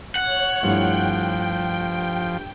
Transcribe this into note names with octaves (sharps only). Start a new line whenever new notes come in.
C#5 F#5
G2 F3 A3 E4 G5